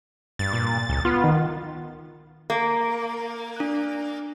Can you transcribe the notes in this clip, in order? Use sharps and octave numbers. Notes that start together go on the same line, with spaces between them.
G2 A6
A#2
C#2
B3 F4
D#3
A#3
D4 F#6